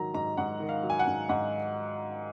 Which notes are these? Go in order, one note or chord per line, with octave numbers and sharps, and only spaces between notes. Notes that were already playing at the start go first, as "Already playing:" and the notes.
Already playing: G#2 D#3 F#3 A#5
G#2 A#5
G#2 F#5
D#3
F5
F#3
G#5
F#5
G#2
G#2 F#5